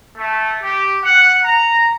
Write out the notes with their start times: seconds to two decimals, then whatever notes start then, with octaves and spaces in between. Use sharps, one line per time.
0.16 A3
0.61 G4
1.04 F#5
1.44 A#5